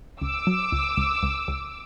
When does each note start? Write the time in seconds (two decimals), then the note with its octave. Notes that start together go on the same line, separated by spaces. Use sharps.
0.22 C#2 D6 E6
0.47 F#3
0.72 C#2
0.97 C#2
1.23 C#2
1.48 C#2